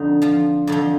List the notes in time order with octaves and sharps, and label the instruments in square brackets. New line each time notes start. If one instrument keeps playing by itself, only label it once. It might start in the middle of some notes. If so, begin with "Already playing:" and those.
Already playing: [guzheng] F2 D3 D#4
F3 F4
F2 D3 F3